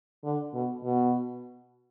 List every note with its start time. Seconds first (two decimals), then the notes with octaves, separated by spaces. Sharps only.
0.24 D3
0.54 B2
0.84 B2